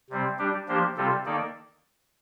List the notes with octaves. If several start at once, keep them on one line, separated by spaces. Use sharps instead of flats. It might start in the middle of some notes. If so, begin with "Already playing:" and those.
C3 G3 C4
G3 D4 G4
F3 A#3 D4 G4 C5
C3 G3 C4 F4 A4
D#3 A#3 D#4 A4 D5